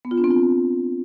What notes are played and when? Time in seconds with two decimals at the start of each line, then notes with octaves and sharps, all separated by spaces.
0.05 B3
0.11 F4
0.18 D4
0.24 C4
0.30 F4